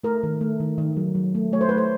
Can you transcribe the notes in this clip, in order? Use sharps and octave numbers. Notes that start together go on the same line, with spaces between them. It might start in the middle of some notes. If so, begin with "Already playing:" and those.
A3 A#4
D#3
A3
D#3
D#3
F#3
F#3
A3
A3 C#5
C5
A3 B4
C5